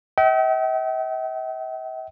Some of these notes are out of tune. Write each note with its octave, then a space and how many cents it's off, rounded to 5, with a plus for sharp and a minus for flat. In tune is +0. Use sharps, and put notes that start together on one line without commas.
E5 -45 G5 -40